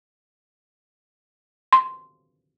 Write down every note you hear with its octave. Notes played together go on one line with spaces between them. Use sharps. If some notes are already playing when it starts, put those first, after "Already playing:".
C6